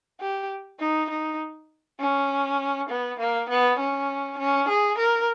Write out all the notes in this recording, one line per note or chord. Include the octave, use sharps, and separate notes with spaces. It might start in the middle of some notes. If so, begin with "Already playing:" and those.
G4
D#4
D#4
C#4
B3
A#3
B3
C#4
C#4
G#4
A#4